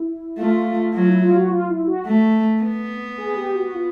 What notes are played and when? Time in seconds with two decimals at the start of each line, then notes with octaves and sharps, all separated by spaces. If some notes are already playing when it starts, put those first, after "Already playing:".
Already playing: E4
0.38 A3 F4
0.94 F#3 F4
1.08 E4
1.22 F4
1.35 F#4
1.50 F4
1.69 E4
1.87 F#4
2.06 A3
2.62 B3
3.18 G#4
3.36 G4
3.55 F#4
3.74 F4